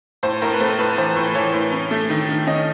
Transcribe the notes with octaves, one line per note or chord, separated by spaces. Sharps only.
A2 C5
A2 A#4
B4
A3 C5
A2 B4
E3 C5
A2
E3 C#5
A2
C#4
A3
D#3
D#3
C#4 D#5